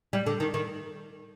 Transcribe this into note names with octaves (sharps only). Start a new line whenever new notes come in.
G3
D3
D#3
D#3